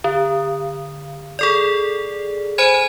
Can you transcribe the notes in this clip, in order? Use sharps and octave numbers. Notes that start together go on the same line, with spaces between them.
D3
G#4 A4 D5
C5 G#5 B5 G#6